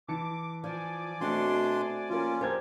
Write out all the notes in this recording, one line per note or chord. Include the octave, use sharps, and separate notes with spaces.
E3 A5 D6 C#7
F3 D5 G#5 D6
B2 A3 C4 D4 F#4 C6
F3 A#3 C#4 F4
F2 D4 G4 A4 A#4 C5 G#6